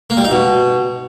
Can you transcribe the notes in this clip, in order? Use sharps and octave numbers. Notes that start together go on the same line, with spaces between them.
A#3
G3
D#4
B2